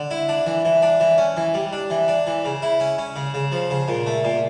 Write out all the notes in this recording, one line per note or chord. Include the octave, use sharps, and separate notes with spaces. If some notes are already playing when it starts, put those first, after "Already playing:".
Already playing: D3
E4
D4
E3
E3
D4
E3
C#4
E3
G3
D4
E3
D4
E3
C#3
E4
C#4
C#4
C#3
C#3
F3
C#3
A#2
A3
A#2